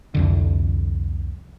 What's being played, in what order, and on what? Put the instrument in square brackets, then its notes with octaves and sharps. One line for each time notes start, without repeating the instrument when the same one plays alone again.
[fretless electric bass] C2 F2 D3